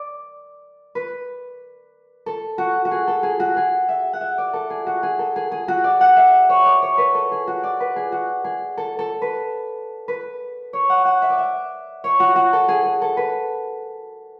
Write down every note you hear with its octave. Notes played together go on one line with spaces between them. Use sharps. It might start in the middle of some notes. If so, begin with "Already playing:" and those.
Already playing: D5
B4
A4
F#4
F#4
G#4
A4
G#4
F#4
G#4
E5
F#5
E5
D5
A4
G#4
F#4
G#4
A4
G#4
G#4
F#4
D5
F#5
E5
C#5
D5
C#5
B4
A4
G#4
F#4
D5
B4
G#4
F#4
G#4
A4
A4
B4
B4
C#5
F#5
F#5
E5
D5
E5
C#5
F#4
F#4
A4
G#4
G#4
A4
B4